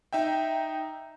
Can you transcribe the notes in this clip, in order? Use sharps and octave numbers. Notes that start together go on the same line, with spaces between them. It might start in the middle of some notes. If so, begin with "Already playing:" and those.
D#4 E5 G5